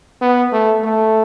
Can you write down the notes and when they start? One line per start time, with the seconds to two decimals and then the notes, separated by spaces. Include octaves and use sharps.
0.21 B3
0.52 A3
0.84 A3